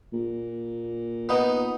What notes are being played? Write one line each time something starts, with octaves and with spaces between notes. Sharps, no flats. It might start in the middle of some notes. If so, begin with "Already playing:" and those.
A#2
B3 D#4